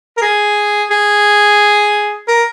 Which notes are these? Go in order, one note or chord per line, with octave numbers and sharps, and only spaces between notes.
A#4
G#4
G#4
A#4